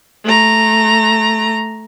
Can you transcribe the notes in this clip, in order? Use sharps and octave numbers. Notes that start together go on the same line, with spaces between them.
A3 A#5